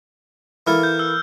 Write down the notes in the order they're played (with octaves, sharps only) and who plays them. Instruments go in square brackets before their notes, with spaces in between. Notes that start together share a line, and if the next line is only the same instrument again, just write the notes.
[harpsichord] E3 A#3 E4 A4 [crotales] F6
[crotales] G6
E6